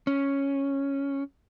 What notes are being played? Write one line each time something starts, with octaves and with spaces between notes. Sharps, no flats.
C#4